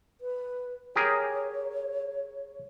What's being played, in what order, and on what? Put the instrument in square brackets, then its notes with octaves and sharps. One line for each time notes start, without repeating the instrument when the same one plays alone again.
[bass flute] B4
[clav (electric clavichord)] G4 G#4 A#4 [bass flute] C#5